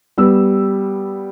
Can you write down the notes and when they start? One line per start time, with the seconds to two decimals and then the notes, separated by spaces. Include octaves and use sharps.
0.18 G3 B3 E6